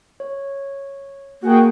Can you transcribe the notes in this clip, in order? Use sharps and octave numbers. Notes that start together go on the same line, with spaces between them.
C#5
A#3 F#4 G#4 G5